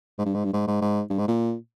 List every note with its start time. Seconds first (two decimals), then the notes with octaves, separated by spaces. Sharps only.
0.18 G#2
0.25 G2
0.35 G#2
0.44 G2
0.53 G#2
0.67 G#2
0.81 G#2
1.10 G2
1.19 G#2
1.28 A#2